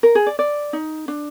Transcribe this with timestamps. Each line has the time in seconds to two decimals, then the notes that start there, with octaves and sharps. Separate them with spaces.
0.03 A#4
0.15 G#4
0.27 D5
0.39 D5
0.73 D#4
1.08 D4